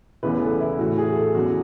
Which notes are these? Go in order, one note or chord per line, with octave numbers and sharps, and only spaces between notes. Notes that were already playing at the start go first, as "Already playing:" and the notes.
E2 C#3 E3 B4
B4
A4
E4
A2 E3 F#4
G#4
A4
E2 C#3 F#3 F#4